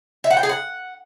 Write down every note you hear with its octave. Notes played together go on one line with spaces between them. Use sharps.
E5
F#5
G5
G#4
F#5